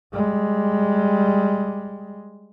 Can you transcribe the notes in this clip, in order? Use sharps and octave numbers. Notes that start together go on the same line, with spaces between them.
G3 G#3